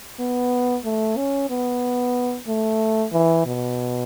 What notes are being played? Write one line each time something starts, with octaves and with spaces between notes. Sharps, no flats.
B3
A3
C#4
B3
A3
E3
B2